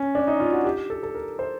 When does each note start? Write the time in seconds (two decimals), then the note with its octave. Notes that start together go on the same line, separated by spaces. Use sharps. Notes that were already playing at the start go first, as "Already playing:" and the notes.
Already playing: C#4
0.15 D4
0.27 D#4
0.40 F4
0.52 F#4
0.64 G4
0.90 A4
1.03 A4
1.15 A#4
1.39 C5